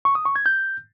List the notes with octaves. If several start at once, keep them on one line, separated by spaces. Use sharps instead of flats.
C#6
D#6
C#6
G#6
G6